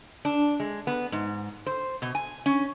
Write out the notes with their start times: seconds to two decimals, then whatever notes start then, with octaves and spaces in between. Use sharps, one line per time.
0.25 D4
0.60 G#3
0.87 B3
1.12 G#2
1.66 C5
2.02 B2
2.15 G#5
2.46 C#4